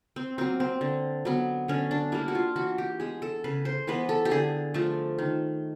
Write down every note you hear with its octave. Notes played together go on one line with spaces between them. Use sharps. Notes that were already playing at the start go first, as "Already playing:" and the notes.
C4
F#3 A#3 C4
C4
D3
F#3 B3
D3 C#4
D4
G3 A#3 E4
F#4
F4
E3 F#4
G4
G#3 B3 G#4
A4
C#3 B4
C5
E3 G#3 B3 B4
A4
G4
D3 G#4
F3 A3
D#3